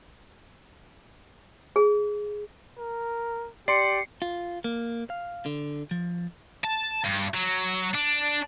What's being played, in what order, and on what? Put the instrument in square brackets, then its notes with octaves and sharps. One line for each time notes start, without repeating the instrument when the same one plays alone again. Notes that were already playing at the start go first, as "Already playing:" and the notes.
[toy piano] G#4
[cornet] A#4
[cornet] G4 [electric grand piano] D5 C6 [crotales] C7 C#7
[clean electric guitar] F4
A#3
F5
D3
F3
[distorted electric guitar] A5
G2
F#3
D4